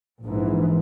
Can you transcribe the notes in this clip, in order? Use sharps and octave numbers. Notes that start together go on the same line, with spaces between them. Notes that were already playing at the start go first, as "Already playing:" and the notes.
A#1 G#2 E3